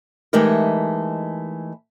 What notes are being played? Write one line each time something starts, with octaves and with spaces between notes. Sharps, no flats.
E3 G#3 A3 D#4 G4 A#4